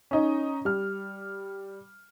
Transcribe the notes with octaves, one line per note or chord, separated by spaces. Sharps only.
C#4 D#4
G3 F6